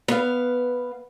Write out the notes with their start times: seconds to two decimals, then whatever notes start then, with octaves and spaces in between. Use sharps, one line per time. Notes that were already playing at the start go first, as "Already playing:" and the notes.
0.08 B3 F5